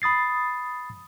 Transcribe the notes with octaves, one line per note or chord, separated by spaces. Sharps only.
B5 D#6 A6 C7